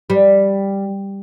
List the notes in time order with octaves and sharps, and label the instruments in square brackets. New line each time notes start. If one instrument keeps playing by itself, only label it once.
[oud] G3